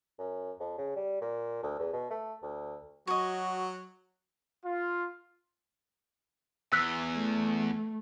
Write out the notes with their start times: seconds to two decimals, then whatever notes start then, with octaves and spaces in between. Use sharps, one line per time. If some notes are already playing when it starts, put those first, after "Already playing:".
0.19 F#2
0.60 F2
0.78 C#3
0.96 G3
1.21 A#2
1.63 D2
1.79 E2
1.93 B2
2.10 A3
2.43 D2
3.07 F#3 F#4 C#5 D#5
4.65 F4
6.72 E2 E6 F#6 B6
7.16 A3